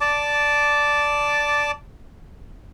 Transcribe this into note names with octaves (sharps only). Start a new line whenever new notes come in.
D5 A5 D6